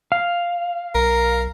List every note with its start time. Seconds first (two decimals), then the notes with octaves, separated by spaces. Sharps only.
0.12 F5
0.95 B1 A#4